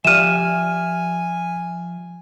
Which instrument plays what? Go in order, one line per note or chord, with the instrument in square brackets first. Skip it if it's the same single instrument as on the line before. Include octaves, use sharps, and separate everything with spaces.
[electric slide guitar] F3 G4 D5 [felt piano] E5 F6 [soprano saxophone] G#5 [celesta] D#7 E7